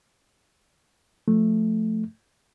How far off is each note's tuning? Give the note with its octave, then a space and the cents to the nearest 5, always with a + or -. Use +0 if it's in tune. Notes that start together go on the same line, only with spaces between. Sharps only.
F3 +5 A3 +0